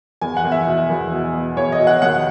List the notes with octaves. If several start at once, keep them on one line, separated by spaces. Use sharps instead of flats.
E2 G#5
F#5
E2
E5
B2
E2
B2
B2
E2 C#5
D#5
B2
F#5
D#2 F#5